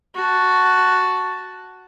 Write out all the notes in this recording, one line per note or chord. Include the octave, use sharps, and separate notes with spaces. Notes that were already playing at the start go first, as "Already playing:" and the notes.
F#4 A5